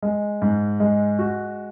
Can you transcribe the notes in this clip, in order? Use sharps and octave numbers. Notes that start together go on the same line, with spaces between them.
G#3
G#2
G#3
F#4